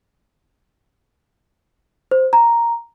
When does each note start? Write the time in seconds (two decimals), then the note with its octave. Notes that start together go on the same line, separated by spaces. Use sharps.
2.11 C5
2.33 A#5